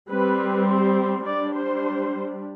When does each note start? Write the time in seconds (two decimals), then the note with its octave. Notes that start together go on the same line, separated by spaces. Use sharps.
0.10 G3 C4 B4
0.67 C5
1.25 G3 D4 D5
1.54 C5